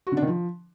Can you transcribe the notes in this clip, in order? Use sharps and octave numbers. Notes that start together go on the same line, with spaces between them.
F#4
D3
D4
D#3
F3